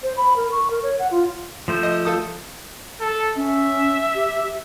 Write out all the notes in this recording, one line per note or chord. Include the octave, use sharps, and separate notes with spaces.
C5
B5
A#4
C#6
A#4
C#5
F#5
F4
F3 A3 C5
D#5
F4 A4 D#6
A4
C#4 E5
G4